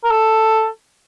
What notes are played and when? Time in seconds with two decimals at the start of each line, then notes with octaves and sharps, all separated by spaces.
0.04 A#4
0.10 A4